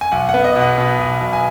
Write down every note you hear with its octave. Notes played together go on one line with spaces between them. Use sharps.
G#5
B1 F#5
F#5
B3
D#5
B2
F#5
B2
B1
B1
G#5